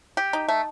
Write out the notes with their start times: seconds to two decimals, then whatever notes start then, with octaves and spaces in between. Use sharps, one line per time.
0.17 G4
0.33 D#4
0.48 A3